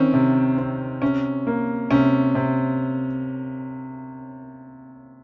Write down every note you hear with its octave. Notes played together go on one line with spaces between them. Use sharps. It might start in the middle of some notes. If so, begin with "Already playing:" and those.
Already playing: D#3 C4 C#4
C3
C4
C3 C#4
A#3
C3 C#4
C3